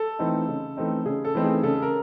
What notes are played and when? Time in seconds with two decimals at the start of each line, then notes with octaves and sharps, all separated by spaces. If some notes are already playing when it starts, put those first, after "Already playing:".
Already playing: A4
0.19 E3 A3 C4 D#4
0.48 C#3
0.77 E3 A3 C4 D#4
1.06 C#3 G#4
1.25 A4
1.35 E3 A3 C4 D#4
1.44 G#4
1.63 C#3 A4
1.82 A#4